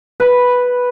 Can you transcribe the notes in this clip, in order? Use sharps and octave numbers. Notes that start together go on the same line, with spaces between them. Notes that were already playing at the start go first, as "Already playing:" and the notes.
B4